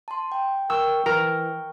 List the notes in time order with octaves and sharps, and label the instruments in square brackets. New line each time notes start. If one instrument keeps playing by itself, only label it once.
[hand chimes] A5 C6
G5
[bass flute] A#4 [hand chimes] G5 C#6 [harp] E6
[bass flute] E3 [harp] A#4